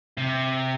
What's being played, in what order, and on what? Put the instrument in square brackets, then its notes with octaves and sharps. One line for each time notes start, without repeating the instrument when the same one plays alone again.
[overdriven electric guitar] C3